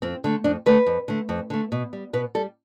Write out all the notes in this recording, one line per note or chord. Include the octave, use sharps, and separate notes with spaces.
F2 C4
D3 A3
F2 D4
D3 A3 B4
F2
D3 A3
F2
D3 A3
B2
G3
B2 B4
G3 A4